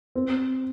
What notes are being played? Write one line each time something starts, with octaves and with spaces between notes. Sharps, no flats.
C4